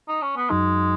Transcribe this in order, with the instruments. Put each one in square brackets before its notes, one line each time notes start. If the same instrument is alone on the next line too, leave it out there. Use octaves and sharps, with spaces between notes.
[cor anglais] D#4
C#4
B3
[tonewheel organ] F#2 F#3 D#4 [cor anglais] G#3